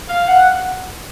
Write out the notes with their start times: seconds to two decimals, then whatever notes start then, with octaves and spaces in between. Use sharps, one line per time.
0.09 F5
0.28 F#5